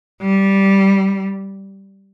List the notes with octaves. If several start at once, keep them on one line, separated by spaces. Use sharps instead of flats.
G3